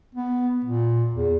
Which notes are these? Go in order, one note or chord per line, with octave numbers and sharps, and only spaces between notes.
B3
A#2
E2